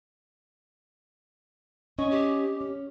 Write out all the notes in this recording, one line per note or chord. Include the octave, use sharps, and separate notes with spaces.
C#4 D#5 C#6
G4
C#4